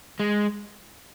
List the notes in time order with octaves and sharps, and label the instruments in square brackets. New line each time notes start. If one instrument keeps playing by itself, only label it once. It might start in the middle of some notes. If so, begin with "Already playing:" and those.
[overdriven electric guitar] G#3